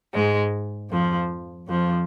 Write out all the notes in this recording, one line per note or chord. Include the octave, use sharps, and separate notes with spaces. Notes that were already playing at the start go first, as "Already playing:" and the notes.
G#2 G#3
F2 F3
F2 F3